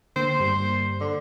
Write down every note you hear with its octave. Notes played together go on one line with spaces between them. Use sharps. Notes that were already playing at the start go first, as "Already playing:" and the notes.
D3 A#3 C5
G2 G3 A#3
D3